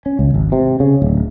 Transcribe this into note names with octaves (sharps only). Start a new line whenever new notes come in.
C#4
C#2
G#1
C3
C#3
D1